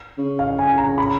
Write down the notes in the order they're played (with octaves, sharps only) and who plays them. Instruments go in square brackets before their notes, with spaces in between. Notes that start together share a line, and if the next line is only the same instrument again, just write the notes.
[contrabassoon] C#3
[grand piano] F5
G#5
A#5
B5